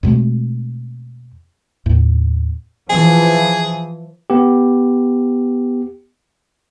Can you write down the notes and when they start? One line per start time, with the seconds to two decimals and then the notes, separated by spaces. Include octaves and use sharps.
0.03 F2 B2 G#3 A3
1.86 D#2 A2
2.90 E3 F3 G#4
4.30 B3 G4